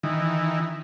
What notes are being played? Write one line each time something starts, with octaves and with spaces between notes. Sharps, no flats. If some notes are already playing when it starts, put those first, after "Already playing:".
D#3 E3